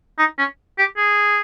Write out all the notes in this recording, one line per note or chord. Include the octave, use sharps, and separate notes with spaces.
D#4
C#4
G4
G#4